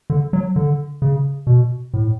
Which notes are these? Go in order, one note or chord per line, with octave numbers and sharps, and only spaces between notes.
D3
F#3
D3
C#3
B2
A2